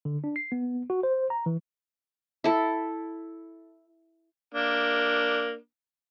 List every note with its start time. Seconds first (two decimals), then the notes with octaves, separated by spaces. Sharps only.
0.05 D3
0.24 D4
0.36 C7
0.52 B3
0.90 F#4
1.03 C5
1.30 A#5
1.46 E3
2.44 E4 A4
4.54 A#3 D4